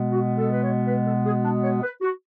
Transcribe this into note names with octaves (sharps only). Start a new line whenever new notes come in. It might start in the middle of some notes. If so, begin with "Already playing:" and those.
Already playing: B2 G#3 B3
F#4
A4
B4
C#5
B4
A4
G#4
D4
C#5
B4
F#4